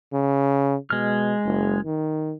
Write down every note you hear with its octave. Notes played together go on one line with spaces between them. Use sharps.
C#3
B2 G#3 F6
F#1
D#3